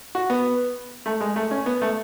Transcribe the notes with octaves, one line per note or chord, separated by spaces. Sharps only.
F#4
B3
A3
G#3
A3
C#4
B3
A3